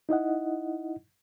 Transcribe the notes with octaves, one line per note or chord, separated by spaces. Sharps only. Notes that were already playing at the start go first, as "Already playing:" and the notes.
D#4 E4 D#5 F#5